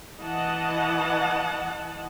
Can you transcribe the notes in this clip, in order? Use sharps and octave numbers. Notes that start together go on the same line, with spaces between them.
E3 D#5 F#5 A5